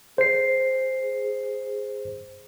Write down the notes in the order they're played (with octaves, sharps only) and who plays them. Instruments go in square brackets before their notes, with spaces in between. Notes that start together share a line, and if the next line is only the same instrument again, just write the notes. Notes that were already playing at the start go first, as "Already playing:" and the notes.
[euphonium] G#4 [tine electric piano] C5 C7